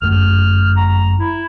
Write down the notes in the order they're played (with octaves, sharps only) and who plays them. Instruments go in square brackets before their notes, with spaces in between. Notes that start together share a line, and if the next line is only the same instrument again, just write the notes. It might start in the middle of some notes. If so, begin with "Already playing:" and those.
[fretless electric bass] G1 F#2 A3 [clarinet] F6
[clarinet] A#5
E4